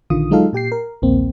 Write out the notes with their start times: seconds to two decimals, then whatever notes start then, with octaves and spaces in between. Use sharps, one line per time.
0.10 A#1 D3 D#3 F4 D#6
0.31 F#3 G#3 D#4 F4 A4 F5
0.53 A#2 G4 G5 C7
0.72 A#4
1.02 A#1 D#2 A#3 C4